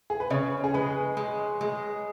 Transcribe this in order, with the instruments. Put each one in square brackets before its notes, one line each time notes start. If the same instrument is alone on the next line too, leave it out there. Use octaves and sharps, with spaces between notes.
[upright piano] G#4
B4
[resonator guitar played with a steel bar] C#3 [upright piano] C#5
[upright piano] G#4
[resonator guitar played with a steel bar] G#3 [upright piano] B4
[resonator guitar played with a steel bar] G#3
G#3